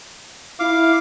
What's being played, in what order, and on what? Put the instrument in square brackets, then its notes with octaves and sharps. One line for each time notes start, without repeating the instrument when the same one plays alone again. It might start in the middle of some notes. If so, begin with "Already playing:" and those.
[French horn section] E4 [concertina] F5 D6